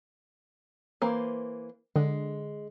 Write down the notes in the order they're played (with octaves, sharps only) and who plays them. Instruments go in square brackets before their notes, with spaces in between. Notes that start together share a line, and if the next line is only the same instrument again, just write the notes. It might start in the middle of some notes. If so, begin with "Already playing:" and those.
[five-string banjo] E3 A#3 C5
[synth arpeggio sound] D3 [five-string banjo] G#3